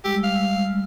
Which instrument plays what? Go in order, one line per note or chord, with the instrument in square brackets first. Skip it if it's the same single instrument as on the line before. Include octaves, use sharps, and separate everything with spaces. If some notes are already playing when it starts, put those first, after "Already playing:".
[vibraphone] G3 G#3 E6 [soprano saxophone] G4
[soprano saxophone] F5